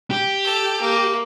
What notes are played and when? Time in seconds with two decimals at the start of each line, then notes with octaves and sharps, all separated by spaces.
0.11 G4
0.45 A4
0.81 A#3